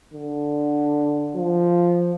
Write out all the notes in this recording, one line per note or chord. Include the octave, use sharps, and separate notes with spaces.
D3
F3